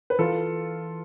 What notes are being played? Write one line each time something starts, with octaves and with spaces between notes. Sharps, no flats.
B4
E3 F4 A4